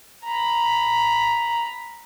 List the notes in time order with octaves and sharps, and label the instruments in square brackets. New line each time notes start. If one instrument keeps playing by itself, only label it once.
[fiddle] A#5 B5